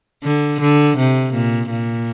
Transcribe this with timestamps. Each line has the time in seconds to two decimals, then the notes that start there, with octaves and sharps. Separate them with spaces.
0.24 D3
0.61 D3
0.98 C3
1.34 A#2
1.71 A#2